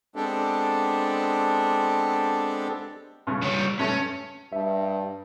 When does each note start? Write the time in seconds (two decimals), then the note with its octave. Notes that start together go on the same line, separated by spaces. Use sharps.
0.16 G#3 B3 C4 D4 G4 A4
3.27 G2 C#3
3.43 G3 C#5
3.79 G2 A3 C#4
4.53 G2 E5 A5